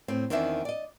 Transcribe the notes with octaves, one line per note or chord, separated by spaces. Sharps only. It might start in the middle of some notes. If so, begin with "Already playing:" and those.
A2 C4
E2 D#3 C4 D4 E4 E5
D5 D#5